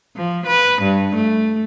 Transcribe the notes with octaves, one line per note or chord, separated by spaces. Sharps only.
F3
B4
G2
A3